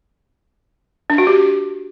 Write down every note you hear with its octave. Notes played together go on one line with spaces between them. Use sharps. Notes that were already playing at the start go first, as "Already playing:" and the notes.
D4
F#4
G4